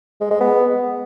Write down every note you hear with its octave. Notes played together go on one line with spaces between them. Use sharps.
G#3
G#3
B3